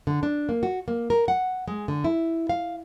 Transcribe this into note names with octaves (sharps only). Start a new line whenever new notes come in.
D3
D4
A#3
F#4
A#3
A#4
F#5
G#3
D3
E4
F5